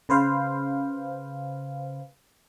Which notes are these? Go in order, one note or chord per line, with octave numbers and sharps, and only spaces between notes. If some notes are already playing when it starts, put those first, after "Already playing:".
C#3 B4 C5 F5